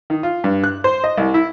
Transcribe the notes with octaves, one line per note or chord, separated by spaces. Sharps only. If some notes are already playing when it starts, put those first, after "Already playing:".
D#3
F4
G2
F#6
C5
D#5
C2
E4